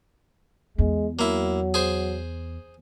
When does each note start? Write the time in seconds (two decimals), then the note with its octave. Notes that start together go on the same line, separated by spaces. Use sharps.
0.78 E2 G#3
1.19 F#3 A#3 E4
1.74 G#4 C5